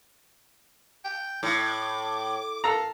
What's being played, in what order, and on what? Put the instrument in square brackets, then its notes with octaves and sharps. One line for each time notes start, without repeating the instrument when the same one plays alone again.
[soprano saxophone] G5
[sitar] A2 [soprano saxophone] D6
[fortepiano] A4 A#5 [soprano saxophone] F5